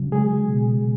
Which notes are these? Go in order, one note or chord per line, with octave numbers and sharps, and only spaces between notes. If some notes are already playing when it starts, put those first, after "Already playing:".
Already playing: C#3 F#3
G#3 G#4
B2